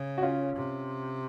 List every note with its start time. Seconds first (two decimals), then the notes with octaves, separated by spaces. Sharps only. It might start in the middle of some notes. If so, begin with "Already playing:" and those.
Already playing: C#3
0.18 F#4
0.22 C#4 F4
0.56 C3